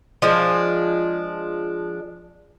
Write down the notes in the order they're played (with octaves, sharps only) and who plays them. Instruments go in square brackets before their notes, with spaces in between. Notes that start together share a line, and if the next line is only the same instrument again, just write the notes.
[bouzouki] F3 G#3 D4